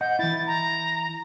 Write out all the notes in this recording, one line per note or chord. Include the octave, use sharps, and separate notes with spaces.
D#5 F#5 G6
E3 E4 A6
A#5